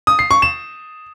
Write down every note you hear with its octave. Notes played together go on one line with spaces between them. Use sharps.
D#6
C7
C#6
E7